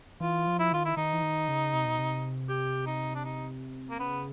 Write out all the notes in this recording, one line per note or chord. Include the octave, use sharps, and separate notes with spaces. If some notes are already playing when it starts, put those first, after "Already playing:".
E3 F4
F3
E4
D#3 F4
E4
D#3 D#4
E3
D#3
C#3
C3
B2
C3
G4
D#4
D4
D#4
A#3
C#3 B3